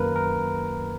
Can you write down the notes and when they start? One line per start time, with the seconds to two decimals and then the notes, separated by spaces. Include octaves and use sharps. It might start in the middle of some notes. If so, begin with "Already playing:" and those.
Already playing: F#2 D#3 F#3 A#3 A#4 B4
0.16 A#4